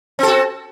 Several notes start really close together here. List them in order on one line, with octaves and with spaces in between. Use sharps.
C4 A4 F#4